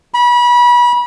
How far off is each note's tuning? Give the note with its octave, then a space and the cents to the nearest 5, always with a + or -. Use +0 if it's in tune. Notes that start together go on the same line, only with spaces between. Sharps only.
B5 -30